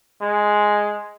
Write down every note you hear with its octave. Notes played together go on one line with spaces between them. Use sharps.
G#3